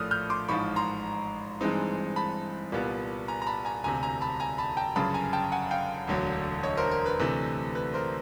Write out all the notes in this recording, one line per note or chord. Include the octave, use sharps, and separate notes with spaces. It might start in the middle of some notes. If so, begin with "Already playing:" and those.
Already playing: A#1 A2 F3 A3 D#6 F6 F#6
F6 G6
C6 D6
A1 G#2 F3 B5 C#6
A#5 C6
G2 E3 G#3 C4 D#4
A5 B5
C2 A#2 G3 B3
G#5 A#5
A#5
A5 B5
G#5 A#5
E1 D2 C3 G#5 A#5
G#5 A#5
A5 B5
G#5 A#5
A5 B5
G5 A5
G1 F#2 C#3 A5 B5
G#5 A#5
G5 A5
F#5 G#5
F5 G5
E1 D2 D3 F#3
C#5 D#5
A#4 C5
A#4
B4
D2 C3 E3 A3
B4
A#4 C5